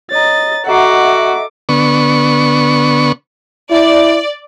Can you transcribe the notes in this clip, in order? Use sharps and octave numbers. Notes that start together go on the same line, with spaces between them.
C#5 D#5 A#5 A6
F#4 A4 D#5 E5 F#5 A#5 D6 C7
D3 B3 C#6
E4 D5